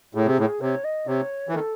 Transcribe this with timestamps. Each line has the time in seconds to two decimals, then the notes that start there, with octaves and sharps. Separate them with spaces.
0.14 A2 G#4
0.26 C3
0.39 A2
0.61 C3 C#5
0.84 D#5
1.07 C3 C#5
1.49 E3
1.54 D#3 A4